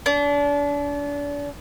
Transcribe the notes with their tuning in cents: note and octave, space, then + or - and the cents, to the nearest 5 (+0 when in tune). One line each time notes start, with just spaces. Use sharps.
D4 -35